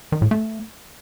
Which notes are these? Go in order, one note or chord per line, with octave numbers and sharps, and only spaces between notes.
D#3
A2
A3